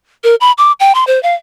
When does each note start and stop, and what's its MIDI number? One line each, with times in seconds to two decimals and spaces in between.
0.24 0.35 70
0.41 0.52 83
0.58 0.72 86
0.80 0.92 79
0.95 1.04 84
1.07 1.21 72
1.23 1.35 77